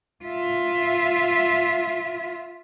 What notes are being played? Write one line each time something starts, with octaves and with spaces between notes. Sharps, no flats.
F4 E5